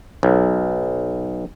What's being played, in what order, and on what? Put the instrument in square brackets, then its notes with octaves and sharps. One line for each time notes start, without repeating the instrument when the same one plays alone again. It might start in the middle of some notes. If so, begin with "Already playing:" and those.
[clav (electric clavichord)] B1